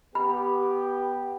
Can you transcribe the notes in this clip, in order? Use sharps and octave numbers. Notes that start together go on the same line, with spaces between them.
B3 G4 B5